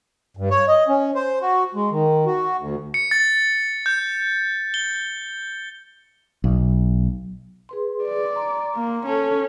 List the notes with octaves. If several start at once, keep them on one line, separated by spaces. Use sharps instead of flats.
G2
C#5
D#5
C#4
C5
F#4
G#3
D#3
F#4
D2
C#7
A6
G6
G7
B1
G#4 B4 C6
D5
A#5 C6
A#3
C#4 A4 A5